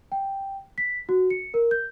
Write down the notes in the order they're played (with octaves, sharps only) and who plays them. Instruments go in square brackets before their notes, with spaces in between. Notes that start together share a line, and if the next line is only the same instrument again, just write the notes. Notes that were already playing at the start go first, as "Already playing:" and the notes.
[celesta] G5
B6
F#4
C#7
A#4
G6